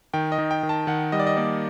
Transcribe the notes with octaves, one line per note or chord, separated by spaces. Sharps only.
D#3 G5
D#5
D#3
G5
D#3
A5
D#3 F#5
G3 D#5
D5
D#5
A#3 D5